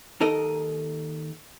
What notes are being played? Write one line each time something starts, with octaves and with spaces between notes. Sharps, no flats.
D#2 D#4 A4 A#4 D#5